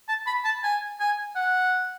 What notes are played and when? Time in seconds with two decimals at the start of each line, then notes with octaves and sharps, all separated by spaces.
0.08 A5
0.27 B5
0.45 A5
0.64 G#5
1.00 G#5
1.36 F#5